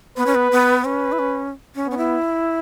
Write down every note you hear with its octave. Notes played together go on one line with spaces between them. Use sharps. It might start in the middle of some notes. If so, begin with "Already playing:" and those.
B3 B4
C#4
B3
B3
C#4 B4
E4
C#4
C#4
B3 C#4
E4